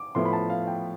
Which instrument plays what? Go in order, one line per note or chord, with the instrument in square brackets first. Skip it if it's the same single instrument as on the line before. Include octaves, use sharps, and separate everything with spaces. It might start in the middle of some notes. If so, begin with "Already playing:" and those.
Already playing: [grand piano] D6
[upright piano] A2 F3 B3 E4 [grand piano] C6
[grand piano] B5
A5
F5
G5